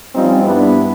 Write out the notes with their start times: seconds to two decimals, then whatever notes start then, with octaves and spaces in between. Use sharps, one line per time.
0.15 F3 G3 C4 C#4 D#4 F4
0.44 G2 G3 B3 D4 E4 B4